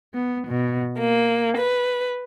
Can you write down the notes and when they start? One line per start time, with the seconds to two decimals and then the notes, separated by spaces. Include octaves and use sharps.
0.14 B3
0.47 B2
1.00 A#3
1.58 B4